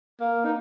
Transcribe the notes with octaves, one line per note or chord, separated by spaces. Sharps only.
A#3
D#4